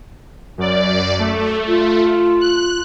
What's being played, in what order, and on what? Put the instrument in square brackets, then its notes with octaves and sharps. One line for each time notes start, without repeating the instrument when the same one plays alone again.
[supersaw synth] F#2 D5
A3
[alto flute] F4
[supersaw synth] F#6